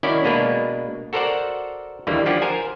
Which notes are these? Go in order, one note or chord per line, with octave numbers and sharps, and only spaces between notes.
D#3 C#4 E4 F#4 D5
B2 G#3 A#3 D4 B4
F#4 A4 A#4 C5 D5 F#5
D#2 D3 E3 G3 A#3
F3 D4 G4 F#5
A#4 C5 G#5